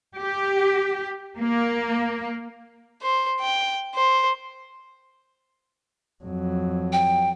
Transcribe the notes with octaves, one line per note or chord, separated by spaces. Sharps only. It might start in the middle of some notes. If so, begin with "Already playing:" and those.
G4
A#3
C5
G5
C5
F2 F#3
G5